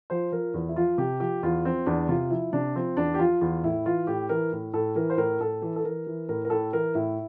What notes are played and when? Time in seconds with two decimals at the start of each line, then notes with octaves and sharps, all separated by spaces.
0.10 F3 C5
0.32 F3 A#4
0.54 E2
0.69 E4
0.76 F3 F4
0.98 C3 G4
1.20 F3 G4
1.43 E2 F4
1.65 F3 C4
1.86 E2 D4
2.08 C3 F4
2.30 F3 E4
2.53 C3 D4
2.75 F3 C4
2.97 E2 D4
3.14 G4
3.19 F3 F4
3.41 E2 F4
3.63 A2 E4
3.86 E3 F4
4.07 A2 G4
4.29 E3 A#4
4.52 A2
4.74 A2 A4
4.96 E3 A#4
5.10 C5
5.17 A2 A#4
5.40 A2 A4
5.62 E3
5.76 A4
5.84 E3 A#4
6.07 E3
6.29 A2 A#4
6.45 A#4
6.50 A2 A4
6.73 E3 A#4
6.95 A2 E4